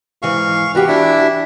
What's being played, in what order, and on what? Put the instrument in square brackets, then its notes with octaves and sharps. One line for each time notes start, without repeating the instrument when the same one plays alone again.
[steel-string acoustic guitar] G#2 E3 [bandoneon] F5 C#6
[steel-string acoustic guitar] E3 F#4 G4 [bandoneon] B4
[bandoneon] D4 E4 E5